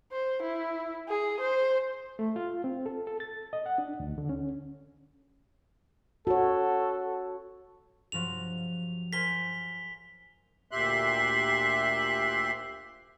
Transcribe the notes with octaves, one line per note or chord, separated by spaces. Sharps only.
C5
E4
G#4
C5
A3
F4
C4
A4
A4
A6
D#5
F#5
D4
D2
D3
C#4
F#4 A4 C#5
G2 F3 F#3 F7
A#4 C5 G#5 B6 G7
D2 A#2 G4 E5 C6 F#6